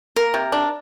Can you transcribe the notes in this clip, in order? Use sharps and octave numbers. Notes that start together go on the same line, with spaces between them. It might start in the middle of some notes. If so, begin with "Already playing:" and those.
A#3 A#4
C3
D4